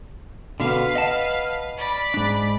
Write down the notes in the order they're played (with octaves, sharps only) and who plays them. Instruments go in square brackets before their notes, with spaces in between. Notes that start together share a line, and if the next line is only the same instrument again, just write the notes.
[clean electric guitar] B2 D3 [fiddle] B4 F5
[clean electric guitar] D#5 F#5 A5
[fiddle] D5 B5
[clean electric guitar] G#2 D4